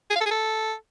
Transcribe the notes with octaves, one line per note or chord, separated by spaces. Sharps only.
G#4
F5
A4
G#4
A4